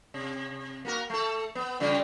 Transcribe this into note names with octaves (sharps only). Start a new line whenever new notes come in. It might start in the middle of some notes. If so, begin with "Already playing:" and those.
C3
A#3 F#4 A#4
A3 A4
B3
C#3 G3 F4